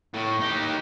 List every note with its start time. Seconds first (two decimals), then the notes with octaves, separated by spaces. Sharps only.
0.14 A2
0.40 D#4 G4